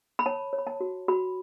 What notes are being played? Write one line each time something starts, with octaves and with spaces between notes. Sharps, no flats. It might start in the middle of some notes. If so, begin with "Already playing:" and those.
B5
C#5 A5
C#5
B5
A5
F#4
F#4 B5